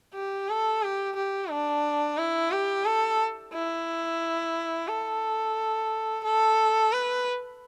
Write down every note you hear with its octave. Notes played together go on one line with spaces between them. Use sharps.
G4
A4
G4
G4
D4
E4
G4
A4
E4
A4
A4
B4